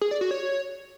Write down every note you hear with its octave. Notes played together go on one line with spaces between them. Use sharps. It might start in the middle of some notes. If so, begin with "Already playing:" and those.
G#4
D5
F#4
C#5